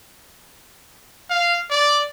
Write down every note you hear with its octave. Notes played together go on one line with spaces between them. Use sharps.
F5
D5